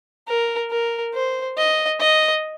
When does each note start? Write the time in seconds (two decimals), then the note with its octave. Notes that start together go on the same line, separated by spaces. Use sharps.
0.28 A#4
0.71 A#4
1.14 C5
1.58 D#5
2.00 D#5